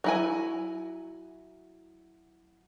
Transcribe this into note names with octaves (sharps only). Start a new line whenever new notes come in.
F#3 E4 G#5